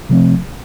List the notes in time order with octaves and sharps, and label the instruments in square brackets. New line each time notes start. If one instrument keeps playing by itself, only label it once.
[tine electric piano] C3 F3 A3 C4